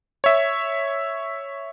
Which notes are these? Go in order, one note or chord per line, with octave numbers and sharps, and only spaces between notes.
C#5 E5